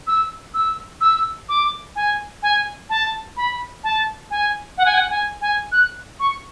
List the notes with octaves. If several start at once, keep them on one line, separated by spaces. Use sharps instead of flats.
E6
E6
E6
D6
G#5
G#5
A5
B5
A5
G#5
F#5
G#5
F#5
G#5
G#5
F#6
C#6